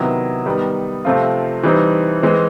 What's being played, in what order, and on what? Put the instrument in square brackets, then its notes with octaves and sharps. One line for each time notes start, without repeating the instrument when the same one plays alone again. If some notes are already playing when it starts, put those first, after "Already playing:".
Already playing: [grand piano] C3 D#3 F#3 B3 E4
D#3 G3 B3
C3 F3 A3 C4 F4
E3 G3 C4 D#4
E3 G#3 C4